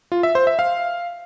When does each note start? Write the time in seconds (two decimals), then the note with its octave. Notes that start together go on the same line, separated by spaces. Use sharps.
0.12 F4
0.23 E5
0.35 C5
0.47 E5
0.59 F5